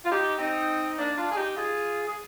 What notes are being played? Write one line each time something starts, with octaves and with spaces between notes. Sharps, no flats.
F4
D#4 G4
C4 D#4
A#3 D4
D4 F4
G#4
D#4 G4
F4 G#4
G#4